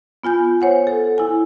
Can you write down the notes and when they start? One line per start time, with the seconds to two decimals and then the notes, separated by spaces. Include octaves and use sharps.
0.23 B3 F4 G#5 G6
0.61 C5 C#5 F#5 G#5
0.87 A4
1.18 E4 G#5